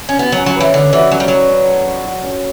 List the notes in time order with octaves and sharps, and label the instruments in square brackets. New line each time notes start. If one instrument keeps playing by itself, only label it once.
[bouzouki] C#4
[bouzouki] B3 [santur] F#4
[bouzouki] F#3
[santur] C#4
[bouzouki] F#3
[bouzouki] E3 [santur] B4
[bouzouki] D3 [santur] D5
[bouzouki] E3 [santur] F#4
[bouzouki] F#3 [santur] C#4
[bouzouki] G3
[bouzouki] F#3 [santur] F#4
[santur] C#4
A4
D5
F#4
C#4